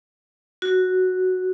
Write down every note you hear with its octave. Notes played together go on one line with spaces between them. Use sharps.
F#4